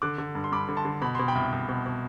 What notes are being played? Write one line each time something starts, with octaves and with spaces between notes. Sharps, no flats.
D3 D6 F#6
D3
G2
C6
G2 B5 D6
D3
A5 C6
D3
B2 B5
B2 C6
G5 B5
C2
C2
B2
B2